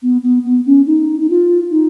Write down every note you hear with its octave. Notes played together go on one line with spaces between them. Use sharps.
B3
B3
B3
C#4
D#4
D#4
F4
D#4